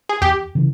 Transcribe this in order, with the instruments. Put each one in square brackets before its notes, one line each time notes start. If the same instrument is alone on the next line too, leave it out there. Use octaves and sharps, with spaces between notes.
[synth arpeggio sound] G#4
[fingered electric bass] E2 [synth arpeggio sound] G4
[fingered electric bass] C#3 E3